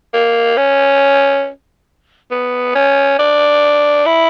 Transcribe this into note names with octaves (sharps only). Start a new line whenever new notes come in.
A#3
C#4
B3
C#4
D4
E4